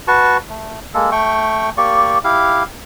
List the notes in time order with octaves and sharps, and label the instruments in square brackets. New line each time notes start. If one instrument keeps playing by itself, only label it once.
[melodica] F#4 B4 A5 C#6
A3
G#3 A#3 A4
A3 G5 C#6
A#3 G4 D5 C#6
E4 G4 F5